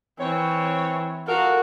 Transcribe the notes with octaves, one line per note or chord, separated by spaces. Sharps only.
E3 C4 C#5
F4 F#4 A4 A#4